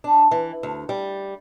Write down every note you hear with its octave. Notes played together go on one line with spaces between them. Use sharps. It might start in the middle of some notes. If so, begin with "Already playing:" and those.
D4
E3
D2
G3